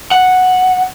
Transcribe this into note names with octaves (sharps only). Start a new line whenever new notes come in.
F#5